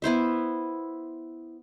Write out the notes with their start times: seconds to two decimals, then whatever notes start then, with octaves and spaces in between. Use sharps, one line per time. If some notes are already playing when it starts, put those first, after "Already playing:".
0.02 B3 E4 C5 E5